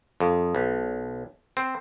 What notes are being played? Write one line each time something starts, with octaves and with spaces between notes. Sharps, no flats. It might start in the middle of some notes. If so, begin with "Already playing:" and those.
F2
B1
C4